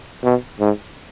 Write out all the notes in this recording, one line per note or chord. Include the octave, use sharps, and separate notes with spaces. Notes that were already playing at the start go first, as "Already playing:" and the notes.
B2
G#2